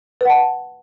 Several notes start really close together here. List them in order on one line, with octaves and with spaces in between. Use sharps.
B4 F#5 A5